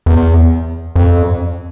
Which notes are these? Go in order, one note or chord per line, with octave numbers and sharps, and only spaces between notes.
E2
F2